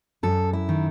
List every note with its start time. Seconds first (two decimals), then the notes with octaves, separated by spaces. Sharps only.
0.23 F#2 A4
0.53 E4
0.69 D#3